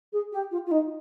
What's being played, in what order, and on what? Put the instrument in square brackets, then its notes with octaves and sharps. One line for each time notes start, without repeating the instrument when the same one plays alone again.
[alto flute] G#4
G4
F4
F4
D#4